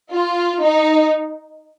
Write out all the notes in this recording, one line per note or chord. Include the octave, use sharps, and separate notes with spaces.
F4
D#4